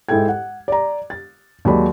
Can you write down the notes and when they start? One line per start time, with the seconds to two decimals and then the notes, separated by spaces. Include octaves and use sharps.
0.09 G#2 E4 A4 G5 G#6
0.29 F#5
0.68 D5 A#5
1.10 A6
1.65 D#2 F#3 G#3 D5 B5